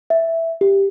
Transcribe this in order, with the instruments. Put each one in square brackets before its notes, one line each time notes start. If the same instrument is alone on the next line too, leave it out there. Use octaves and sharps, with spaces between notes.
[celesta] E5
G4